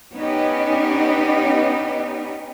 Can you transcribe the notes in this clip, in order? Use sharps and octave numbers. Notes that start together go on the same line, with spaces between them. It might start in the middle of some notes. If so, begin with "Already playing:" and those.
B3 C#4 D#4 G4